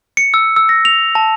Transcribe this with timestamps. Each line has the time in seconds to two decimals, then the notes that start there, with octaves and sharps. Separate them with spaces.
0.17 C#7
0.34 E6
0.56 E6
0.69 A#6
0.85 F7
1.15 A5